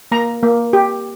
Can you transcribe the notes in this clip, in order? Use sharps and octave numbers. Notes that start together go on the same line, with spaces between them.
A#3 A#5
A#3
G4